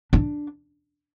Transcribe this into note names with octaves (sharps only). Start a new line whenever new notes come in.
D4